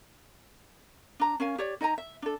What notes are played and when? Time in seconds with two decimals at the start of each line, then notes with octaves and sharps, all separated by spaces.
1.20 D4 A#5
1.40 C#4 A#4 F5 G#5
1.58 G4 C#5 D5
1.81 D#4 D#5 G#5 A#5
1.98 E5
2.22 D4 A4